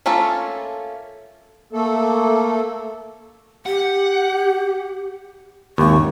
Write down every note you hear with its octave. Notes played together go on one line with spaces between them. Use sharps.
A3 A#3 C#4 F4 A4
A3 A#3 A4
G4 F#5
G#1 D#2 C#6